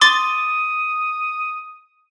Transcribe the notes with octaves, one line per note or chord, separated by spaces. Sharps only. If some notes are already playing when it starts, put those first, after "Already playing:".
C6 D6 D#6 A6